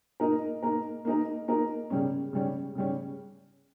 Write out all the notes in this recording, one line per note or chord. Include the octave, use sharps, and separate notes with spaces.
A#3 D#4 A#4
A#3 D#4 A#4
A#3 D#4 A#4
A#3 D#4 A#4
C#3 G3 C#4
C#3 G3 C#4
C#3 G3 C#4